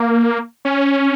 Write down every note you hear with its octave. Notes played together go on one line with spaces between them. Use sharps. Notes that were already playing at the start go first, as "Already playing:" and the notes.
Already playing: A#3
C#4